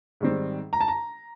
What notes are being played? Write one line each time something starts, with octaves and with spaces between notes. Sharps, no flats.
G#2 D#3 G3 C4
A#5
A5
A#5